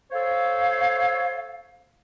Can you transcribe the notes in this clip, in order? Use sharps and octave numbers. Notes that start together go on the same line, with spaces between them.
A4 C5 C#5 F5